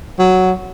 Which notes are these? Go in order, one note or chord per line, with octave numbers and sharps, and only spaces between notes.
F#3